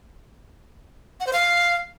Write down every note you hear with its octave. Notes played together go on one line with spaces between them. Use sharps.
F#5
C5
F5